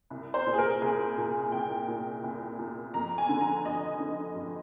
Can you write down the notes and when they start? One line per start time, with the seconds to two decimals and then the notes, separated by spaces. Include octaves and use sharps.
0.10 C2
0.34 C5
0.46 A#2
0.54 G#4
0.58 A#4
0.81 C2 G#4
1.18 A#2
1.52 C2 G5
1.88 A#2
2.23 C2
2.59 A#2
2.94 F2 A#5
3.18 G#5
3.29 D3
3.41 A#5
3.65 F2 D#5
4.00 D3
4.35 F2